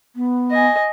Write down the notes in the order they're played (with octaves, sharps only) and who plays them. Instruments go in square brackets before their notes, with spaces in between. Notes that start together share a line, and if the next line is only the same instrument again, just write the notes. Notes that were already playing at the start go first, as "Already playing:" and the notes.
[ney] B3
[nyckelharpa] D#5 G#5